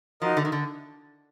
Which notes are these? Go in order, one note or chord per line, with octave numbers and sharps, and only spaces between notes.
F3 D#4 F#4 A#4 D#5
D3
D#3
D3